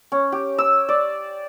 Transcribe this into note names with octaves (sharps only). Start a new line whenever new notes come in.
C#4
G4
E6
D5